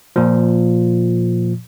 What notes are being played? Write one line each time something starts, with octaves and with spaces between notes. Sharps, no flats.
A#2 F3